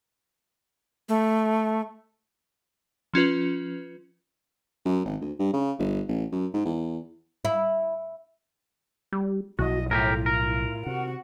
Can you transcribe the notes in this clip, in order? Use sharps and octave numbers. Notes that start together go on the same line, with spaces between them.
A3
F3 C#4 F4 B4
F#2
G#1
D2
G2
C#3
G1
A1
F#2
G#2
E2
E4
G3
B1 B2 F3 E4 F#4 D#5
A2 E4 F4 G4 G#4 A#4
A#4
C3 F#4 F#5